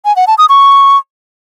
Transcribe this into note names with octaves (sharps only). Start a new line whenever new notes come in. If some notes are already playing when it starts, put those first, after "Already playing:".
G#5
F#5
A5
D#6
C#6